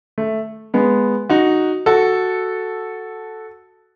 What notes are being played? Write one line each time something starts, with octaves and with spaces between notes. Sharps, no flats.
A3
G#3 B3
D#4 F#4
F#4 A4